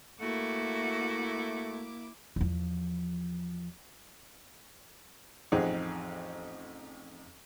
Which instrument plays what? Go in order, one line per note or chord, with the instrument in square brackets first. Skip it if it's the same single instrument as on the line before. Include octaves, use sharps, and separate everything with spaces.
[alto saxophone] A3 [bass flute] A#3 [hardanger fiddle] E4 D6 [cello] F#4
[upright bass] E2 F3
[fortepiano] A1 F2 C4 D#4 G#4 F#5